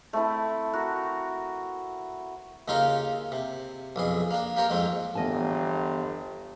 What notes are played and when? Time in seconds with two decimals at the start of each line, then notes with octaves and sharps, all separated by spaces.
0.13 A3 C4 E4
0.73 F#4 A#4
2.68 D#2 C#3 D#4 F4 A4 A#4
3.32 C3
3.96 B1 F2 G#4
4.31 A#3 D4
4.56 A#3 G4 A#4 C#5
4.70 F2 G#2 C4
5.15 G1 E2 D#5 A5